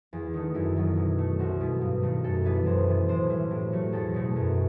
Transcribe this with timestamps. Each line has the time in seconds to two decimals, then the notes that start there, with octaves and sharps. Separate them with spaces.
0.13 E2
0.33 D#3 A3 D#4
0.54 F#2 E4
0.76 D#3 F#3 B3
0.97 B2
1.18 A3
1.39 C2 F#4
1.60 B2 G3 B3
1.81 G2
2.03 D#3 A3
2.24 F#2 A4
2.45 E3 B3 B4
2.66 F#2 C5
2.87 E3 B3
3.08 A2 C5
3.30 E3 G3
3.51 A2
3.72 F#3 A3
3.92 E2 A4
4.14 B2 A3
4.35 F#2